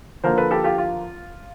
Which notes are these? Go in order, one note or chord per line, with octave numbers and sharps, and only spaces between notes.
D3 F3 A#3 A#4 C5
A4 B4
G4 A4
F4 G4
F4